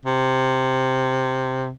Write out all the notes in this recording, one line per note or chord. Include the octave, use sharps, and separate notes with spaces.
C3